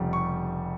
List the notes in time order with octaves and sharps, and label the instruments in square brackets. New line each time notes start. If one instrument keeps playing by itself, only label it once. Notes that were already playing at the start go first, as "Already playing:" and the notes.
Already playing: [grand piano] F1 F2 C#3 G3
C#6